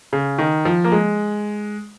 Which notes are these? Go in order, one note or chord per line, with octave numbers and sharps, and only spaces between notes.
C#3
D#3
F3
A#3
G#3